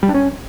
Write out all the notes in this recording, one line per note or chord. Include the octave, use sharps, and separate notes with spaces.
G3
D4
C#4